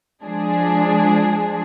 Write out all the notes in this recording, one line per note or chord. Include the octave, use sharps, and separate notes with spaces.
F3 G#3 D4 G#4